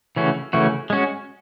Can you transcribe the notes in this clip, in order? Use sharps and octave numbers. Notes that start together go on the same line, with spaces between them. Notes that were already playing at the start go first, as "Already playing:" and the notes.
C#3 E3 A3 C#4 F#4
C#3 E3 A3 C#4 F#4
G#3 C#4 F#4